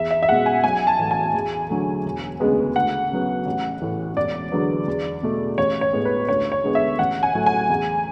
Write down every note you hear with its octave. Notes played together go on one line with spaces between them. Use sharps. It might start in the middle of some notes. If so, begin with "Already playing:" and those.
Already playing: E2 E5
E5
E5
B2 G#3 F#5
G#5
B1 G#5
A5
A2 E3
G#5
E2
D3 F#3 A3
E1
D2 C#3 G#3 B3
D2 F#5
C#3 F#3 B3
A1
A2 E3
E1 D5
E2 D3 F#3 B3
E2
B2 A3
A1 C#5
C#5
A2 G#3 B3
B4
D2 C#5
C#5
D3 G#3 B3
E5
A1 F#5
G#5
A2 F#3 A3
G#5
E2